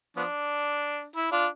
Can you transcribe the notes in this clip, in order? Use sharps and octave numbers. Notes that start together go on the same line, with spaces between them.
F3 B3 D4
E4
D4 F4